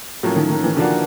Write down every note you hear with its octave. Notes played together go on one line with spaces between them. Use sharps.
A2 F3 F#3 A#3 C#4
D#3
D#3
E3
D3 F3 A#3 D4 F#4